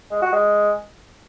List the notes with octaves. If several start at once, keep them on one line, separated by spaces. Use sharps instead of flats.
G#3
F#4
G#3